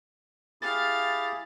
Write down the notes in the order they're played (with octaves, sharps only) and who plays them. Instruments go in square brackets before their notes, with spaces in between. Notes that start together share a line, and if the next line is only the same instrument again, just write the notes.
[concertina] E4 G4 G#4 [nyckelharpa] F5 [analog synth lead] A6